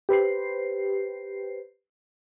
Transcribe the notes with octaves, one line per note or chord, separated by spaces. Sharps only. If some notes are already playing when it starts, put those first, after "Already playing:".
G4 B4 C5 C7